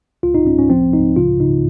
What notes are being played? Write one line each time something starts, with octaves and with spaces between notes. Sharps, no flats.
C#2 F4
D#4
C#2 C#4
C#4
F3 C4
C#2 D#4
C#3 F4
C#3 D#4